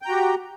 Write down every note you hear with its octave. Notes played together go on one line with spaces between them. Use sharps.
F#4 G4 G5 A#5